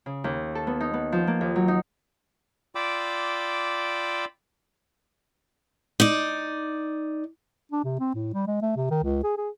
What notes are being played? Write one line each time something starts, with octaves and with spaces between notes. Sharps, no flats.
C#3
D#2
A4
B3
D#4
B3
F3
A#3
D#2
F#3
D#4
F4 D5 G5 B5 D6 E6
D#4 D5
D4
C3
C4
A2
G3
G#3
A3
C3
D#3
C#2
G#4
G#4